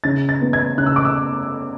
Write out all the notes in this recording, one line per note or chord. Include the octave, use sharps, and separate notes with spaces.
C#3 A6
A6
B3
G#6
C#3 F#6
E6
D6
E6